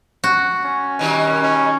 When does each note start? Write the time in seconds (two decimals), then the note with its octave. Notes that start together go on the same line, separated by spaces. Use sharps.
0.24 F#4
0.64 C#4
0.99 B2 D#3 G3
1.43 C#4